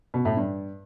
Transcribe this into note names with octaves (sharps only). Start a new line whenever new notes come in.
B2
A2
G2